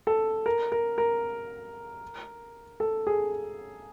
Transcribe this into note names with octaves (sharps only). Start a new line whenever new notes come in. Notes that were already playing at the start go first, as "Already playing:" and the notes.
A4
A#4
A#4
A#4
A4
G#4